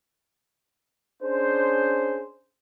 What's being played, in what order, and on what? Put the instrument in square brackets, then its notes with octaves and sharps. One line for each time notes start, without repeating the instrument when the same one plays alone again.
[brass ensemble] C#4 D4 G#4 C5